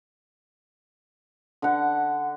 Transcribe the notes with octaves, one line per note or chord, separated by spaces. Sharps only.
D3 F#5